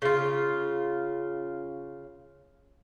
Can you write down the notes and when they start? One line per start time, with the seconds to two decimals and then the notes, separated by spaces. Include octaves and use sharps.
0.02 C#3 F4